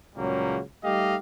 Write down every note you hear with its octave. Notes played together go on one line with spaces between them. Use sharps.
C#2 A#2 C#3 F#3 G3 A#3
G3 A3 D#4 G4 D#5 F5